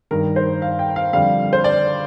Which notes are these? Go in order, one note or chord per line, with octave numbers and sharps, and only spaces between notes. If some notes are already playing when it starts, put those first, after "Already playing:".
G2 D#3 G3 A#4
C5
F5
G5
F5
F2 D3 G3 F5
C5
D5